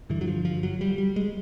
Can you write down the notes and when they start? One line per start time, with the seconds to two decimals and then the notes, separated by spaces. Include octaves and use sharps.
0.09 G2 D3 E3
0.21 F#3
0.28 F3
0.45 F3
0.63 F#3
0.81 G3
0.98 G3
1.16 G#3